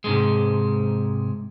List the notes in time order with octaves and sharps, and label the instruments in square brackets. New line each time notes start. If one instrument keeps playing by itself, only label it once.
[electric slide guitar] G#2 C3 G#3